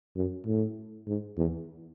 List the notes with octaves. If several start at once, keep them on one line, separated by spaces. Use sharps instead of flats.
F#2
A2
G#2
E2